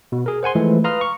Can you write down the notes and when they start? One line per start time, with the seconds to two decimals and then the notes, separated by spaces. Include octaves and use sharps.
0.12 B2
0.26 G#4 A#4
0.43 C5 F#5 G#5 C6
0.55 E3 F3 G#3 A3
0.84 B4 F5 A#5 C6 D#6 F6
1.01 C#6